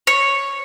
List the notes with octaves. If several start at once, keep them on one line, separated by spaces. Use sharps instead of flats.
C#5